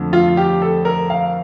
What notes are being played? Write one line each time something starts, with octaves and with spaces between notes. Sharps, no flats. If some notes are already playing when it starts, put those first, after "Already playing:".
Already playing: F2 D3 A3
F4
G4
A4
A#4
F5